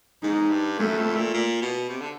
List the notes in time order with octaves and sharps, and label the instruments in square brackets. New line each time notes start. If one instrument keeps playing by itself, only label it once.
[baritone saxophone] G#2 [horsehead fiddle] D#4
[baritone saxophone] G2
[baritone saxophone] F#2 [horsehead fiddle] A3
[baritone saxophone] F2
A#2
A#2
B2
C3
D3